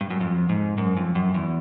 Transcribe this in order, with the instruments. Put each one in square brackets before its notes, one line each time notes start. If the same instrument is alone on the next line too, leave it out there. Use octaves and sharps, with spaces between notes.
[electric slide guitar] G2
F#2
F2
G#2
F#2
F2
F#2
E2